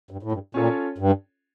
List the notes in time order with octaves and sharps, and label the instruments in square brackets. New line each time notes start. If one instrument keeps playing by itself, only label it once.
[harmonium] G2
A2
G2
[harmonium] A#2 [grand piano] C#4 F4 A4 C#5
[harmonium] G2